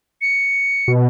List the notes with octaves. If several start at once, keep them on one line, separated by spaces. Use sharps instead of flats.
C#7
B2